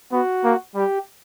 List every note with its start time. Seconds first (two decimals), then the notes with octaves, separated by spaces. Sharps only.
0.12 B3 F#4
0.44 A#3
0.75 G3 G4